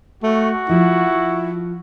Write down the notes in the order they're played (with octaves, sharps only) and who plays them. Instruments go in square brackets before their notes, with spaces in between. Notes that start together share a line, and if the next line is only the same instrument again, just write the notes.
[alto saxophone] A3 [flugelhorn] F#4
[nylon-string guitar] F3 [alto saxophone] E4